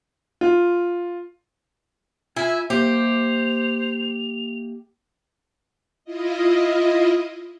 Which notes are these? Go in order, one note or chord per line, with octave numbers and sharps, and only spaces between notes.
F4
E4 F4 E5 G#5
A#3 G4 C5 E5 F7
E4 F4 D#5